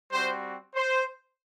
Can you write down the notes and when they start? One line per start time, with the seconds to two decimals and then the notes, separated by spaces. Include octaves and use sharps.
0.11 G3 C4 F#4 C5
0.75 C5